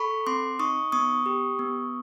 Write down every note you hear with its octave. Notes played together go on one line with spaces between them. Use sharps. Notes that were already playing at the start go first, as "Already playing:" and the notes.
Already playing: A4 B5 C#6
C4 C6 D6
D#4 C#6 D#6
B3 C#6 D#6
G4
B3